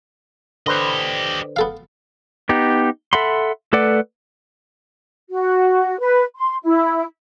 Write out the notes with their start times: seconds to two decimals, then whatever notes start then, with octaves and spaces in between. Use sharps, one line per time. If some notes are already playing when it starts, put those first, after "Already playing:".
0.66 D3 G4 B4 C5 D#5
1.56 B3 A4 F5
2.49 B3 D#4 G4
3.13 A4 E5 F#5 B5 C6
3.73 A3 A4 B4 D5 F#5
5.30 F#4
5.99 B4
6.36 C6
6.64 E4